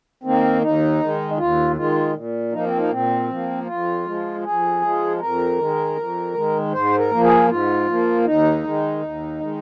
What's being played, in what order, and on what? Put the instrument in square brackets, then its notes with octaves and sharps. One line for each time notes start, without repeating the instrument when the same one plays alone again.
[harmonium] D#3 A#3 C4
D#2 D#4
D#3 G#3
D#2 F4
D#3 G#3 F4
A#2
F3 A#3 D#4
C4
D#4
A#2 C4
F3 A#3
F2 F4
F3 G#3
F2 G#4
F3 G#3
F2 A#4
D#3 G#3
F2
D#3 G#3
G#2 C5
A#4
F3 A#3
G#4
G#2 F4
F3 A#3
D#2 D#4
D#3 G#3
D#2
D#3 G#3